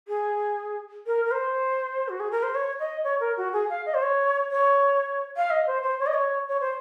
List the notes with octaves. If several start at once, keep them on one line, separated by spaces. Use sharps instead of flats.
G#4
A#4
A#4
C5
F#4
G#4
A#4
C5
C#5
D#5
C#5
A#4
F#4
G#4
F5
D#5
C5
C#5
C#5
F5
D#5
C5
C5
C#5
D#5
C#5
C#5
C5